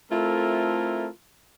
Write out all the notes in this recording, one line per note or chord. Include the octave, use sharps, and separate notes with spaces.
A3 C4 E4 F4 A4 A#4